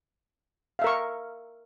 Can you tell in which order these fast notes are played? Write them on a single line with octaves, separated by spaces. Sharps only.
F5 E5 A#4 C#6